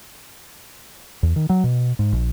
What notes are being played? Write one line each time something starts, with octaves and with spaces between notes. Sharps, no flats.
E2
D#3
F#3
B2
G#2
A#1